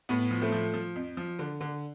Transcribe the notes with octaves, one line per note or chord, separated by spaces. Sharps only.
A2 B3
F3
A3 C4
F3
F3
F2
F3
D3
D3